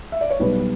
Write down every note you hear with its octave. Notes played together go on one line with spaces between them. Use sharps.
E5
D5
C#5
B1 B2 G3 B4